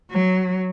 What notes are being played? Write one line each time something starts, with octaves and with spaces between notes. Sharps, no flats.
F#3